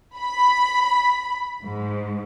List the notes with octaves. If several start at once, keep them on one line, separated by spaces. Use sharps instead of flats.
B5
G#2